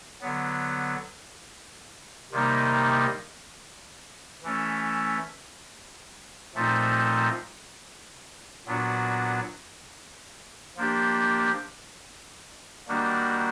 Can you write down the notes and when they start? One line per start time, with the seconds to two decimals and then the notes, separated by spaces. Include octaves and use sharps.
0.21 D3 F#3 B3
2.32 C3 D#3 G3 A#3 D#4
4.43 E3 A3 C#4
6.55 A#2 F3 A3 C4 D#4
8.66 A#2 F#3 B3 D4 F#4
10.77 F3 A#3 D4 G4
12.88 D#3 G3 A#3 D4 F#4